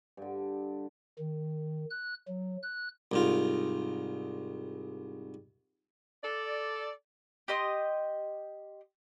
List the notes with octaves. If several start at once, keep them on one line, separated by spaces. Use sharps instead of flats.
G2 D3
D#3
F#6
F#3
F#6
C2 G#2 F4
A4 D5
G4 D#5 C6 D#6